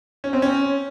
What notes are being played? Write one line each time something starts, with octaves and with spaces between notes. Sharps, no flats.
C#4
C4
C#4